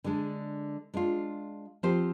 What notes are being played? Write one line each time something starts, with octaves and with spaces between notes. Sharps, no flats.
D3 G#3 D4
G#3 D4 F4
F3 C4 G4 C5